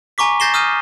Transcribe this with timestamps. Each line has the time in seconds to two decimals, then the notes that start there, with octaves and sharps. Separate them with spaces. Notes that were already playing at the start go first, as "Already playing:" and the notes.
0.18 G#5 A#5 C#6 D6 B6
0.40 G6 A6 A#6 C7 E7 G7
0.54 D#6 F6 G6 D#7